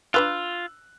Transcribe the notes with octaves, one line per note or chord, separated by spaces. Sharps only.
D4 F4 B4 F5 E6 F#6